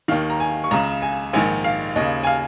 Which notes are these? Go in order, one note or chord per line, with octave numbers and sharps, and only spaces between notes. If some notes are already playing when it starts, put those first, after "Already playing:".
D#2 D#3 F5
A#5
G#5
C#6
C#2 C#3 A#5
G#5
A#1 G#2 D#3 G#5
F5
D#2 C#3 D#5
G#5
F5